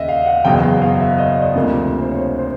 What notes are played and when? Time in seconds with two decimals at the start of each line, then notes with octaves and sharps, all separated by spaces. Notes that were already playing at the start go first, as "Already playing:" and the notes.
Already playing: D#2 C#3 D#5 E5
0.09 F5
0.26 F#5
0.45 F#1 E2 B2 F#3 G5
0.63 F5
0.82 F5
1.00 E5
1.18 D#5
1.37 D5
1.56 D2 C3 F3 A#3
2.02 C5
2.10 C#5
2.39 C5